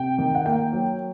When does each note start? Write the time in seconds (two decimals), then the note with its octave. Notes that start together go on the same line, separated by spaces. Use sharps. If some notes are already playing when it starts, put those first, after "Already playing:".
Already playing: C3 G5
0.18 D#3
0.35 F#5
0.45 A#3 G5
0.73 F#3